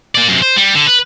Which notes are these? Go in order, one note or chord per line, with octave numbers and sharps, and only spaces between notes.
A#3 D5
F#2 C3
C5
G3
D3
B4